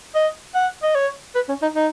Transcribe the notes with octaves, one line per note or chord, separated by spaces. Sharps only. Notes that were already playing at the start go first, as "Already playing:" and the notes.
D#5
F#5
D#5
C#5
B4
C#4
D#4
D#4